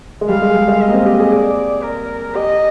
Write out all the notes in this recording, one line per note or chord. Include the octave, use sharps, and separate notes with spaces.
G#3
G3 F5
G#3
G3
G#3
D#5
A#3
C4
G4
G#4
D5
A#4
G4 D#5